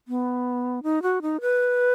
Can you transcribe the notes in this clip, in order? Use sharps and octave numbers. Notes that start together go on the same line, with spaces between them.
B3
D#4
F#4
D#4
B4